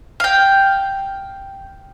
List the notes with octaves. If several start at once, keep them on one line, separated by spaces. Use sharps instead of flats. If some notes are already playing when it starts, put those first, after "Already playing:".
F5 G5